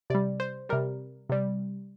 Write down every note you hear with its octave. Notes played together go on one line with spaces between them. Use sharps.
C3 G3 D5
C5
C3 G3 A#4
C3 G3